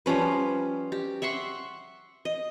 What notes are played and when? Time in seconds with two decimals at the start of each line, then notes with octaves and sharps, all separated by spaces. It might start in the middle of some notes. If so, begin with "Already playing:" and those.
0.06 F3 G3 C#4 B4
0.92 G4
1.22 E5 F#5 C6 C#6
2.25 D#5